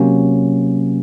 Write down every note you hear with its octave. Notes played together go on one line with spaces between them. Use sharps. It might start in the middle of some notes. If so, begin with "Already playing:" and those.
Already playing: C3 F#3 A#3 C#4